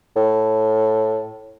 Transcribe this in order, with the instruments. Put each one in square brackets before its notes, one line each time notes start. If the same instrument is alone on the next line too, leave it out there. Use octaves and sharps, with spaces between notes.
[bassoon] A2